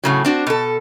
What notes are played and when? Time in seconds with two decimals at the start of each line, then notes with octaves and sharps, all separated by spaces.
0.04 A2 C#3 F#3
0.25 C4 D4 F#4
0.47 B2 A4